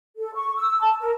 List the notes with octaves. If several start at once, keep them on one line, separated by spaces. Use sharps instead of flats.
A4
C#6
E6
A5
A#4